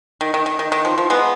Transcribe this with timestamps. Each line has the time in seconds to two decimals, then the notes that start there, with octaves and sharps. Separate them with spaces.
0.21 D#3
0.34 D#3
0.46 D#3
0.59 D#3
0.72 D#3
0.85 F3
0.98 F3
1.10 G#3 B3